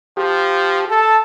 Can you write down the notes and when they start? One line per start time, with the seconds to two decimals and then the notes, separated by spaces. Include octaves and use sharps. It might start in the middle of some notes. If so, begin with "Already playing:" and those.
0.17 F3 G4
0.89 A4 A5